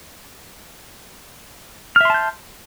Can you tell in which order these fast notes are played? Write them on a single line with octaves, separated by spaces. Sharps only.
F6 E5 C6 A5 G6